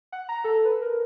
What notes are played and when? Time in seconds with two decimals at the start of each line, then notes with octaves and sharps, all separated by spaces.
0.12 F#5
0.29 A#5
0.44 A4
0.65 B4
0.82 A#4